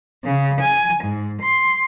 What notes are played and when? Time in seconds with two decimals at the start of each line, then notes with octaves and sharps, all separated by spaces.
0.22 C#3
0.59 G#5
1.01 G#2
1.40 C6